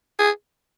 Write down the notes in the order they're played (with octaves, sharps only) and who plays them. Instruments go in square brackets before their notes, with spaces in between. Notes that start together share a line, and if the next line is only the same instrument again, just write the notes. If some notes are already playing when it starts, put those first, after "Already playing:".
[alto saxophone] G#4